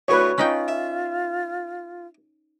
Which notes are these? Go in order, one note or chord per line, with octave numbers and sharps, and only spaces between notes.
D2 A2 A3 B4 C#5
C#4 D#4 F4 G5 B5
E5